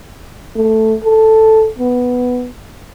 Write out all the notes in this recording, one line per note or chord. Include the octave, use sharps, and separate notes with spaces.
A3
A4
B3